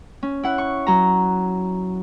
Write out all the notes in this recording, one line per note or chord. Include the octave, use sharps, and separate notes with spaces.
C#4
E4 F#5
C#6
F#3 A#5